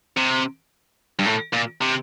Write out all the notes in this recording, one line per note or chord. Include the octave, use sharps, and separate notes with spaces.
C3
G2
A2
A#2
C3